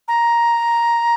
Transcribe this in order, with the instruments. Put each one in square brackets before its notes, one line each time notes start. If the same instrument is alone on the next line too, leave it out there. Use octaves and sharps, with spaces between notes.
[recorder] A#5